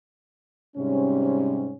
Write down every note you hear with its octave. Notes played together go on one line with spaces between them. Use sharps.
G#2 C3 G3 C#4